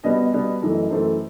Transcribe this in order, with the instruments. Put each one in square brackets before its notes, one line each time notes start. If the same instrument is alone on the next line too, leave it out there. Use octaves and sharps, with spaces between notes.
[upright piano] B2 G3 B3 D#5
D#5
B2 G3 B3
F#2 E3 A3
F#2 E3 A3 C5